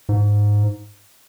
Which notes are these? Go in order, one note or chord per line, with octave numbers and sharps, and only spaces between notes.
G#2